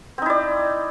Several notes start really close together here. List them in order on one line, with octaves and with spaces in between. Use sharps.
C4 D#4 E4 D5